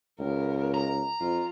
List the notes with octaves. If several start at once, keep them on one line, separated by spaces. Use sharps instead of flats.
C#2 B3 A#4
A#5
F2 F4